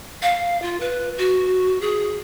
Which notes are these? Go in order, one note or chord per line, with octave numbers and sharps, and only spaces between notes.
F5
F4
B4
F#4
G#4